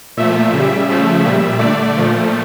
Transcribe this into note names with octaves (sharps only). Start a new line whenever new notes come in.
A#2 F3 A3 E5
C#3 G3
C#3 F3 A3
A#2 G3
D3 A3 D5
A#2 F3 A3